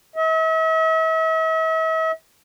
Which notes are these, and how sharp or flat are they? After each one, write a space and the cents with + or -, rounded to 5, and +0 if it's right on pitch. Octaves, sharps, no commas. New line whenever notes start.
E5 -45